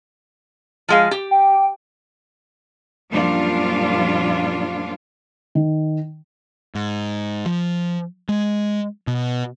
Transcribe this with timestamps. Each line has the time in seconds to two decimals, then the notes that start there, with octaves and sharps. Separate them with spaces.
0.89 F3 G#3 F5
1.11 G4
1.31 G5
3.12 F#2 A#2 F3 G3 D4 F4
5.55 D#3
6.75 G#2
7.46 F3
8.29 G#3
9.07 B2